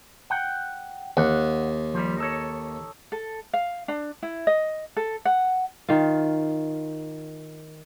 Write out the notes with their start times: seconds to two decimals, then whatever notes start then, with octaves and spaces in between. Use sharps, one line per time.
0.30 F#5 G5
1.17 D#2 F#5
1.94 F3 G3
2.18 D#4 A4 C#5
3.12 A4
3.53 F5
3.88 D4
4.23 E4
4.47 D#5
4.97 A4
5.25 F#5
5.89 D#3 F4